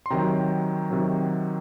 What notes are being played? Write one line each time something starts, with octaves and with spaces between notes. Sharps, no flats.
C6
C3 D#3 F#3 G5 A#5
C3 D#3 F#3